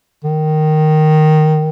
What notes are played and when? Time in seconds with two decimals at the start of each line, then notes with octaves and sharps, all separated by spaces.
0.24 D#3